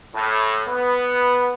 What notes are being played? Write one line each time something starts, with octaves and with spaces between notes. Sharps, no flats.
A2
B3